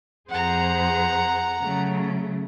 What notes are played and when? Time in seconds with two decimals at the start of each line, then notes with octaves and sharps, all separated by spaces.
0.29 F2 G#4 C5 F#5 A#5
1.62 C#3 F#3 A3